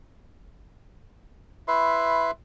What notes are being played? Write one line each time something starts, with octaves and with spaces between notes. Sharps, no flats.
E4 B4 E5 C6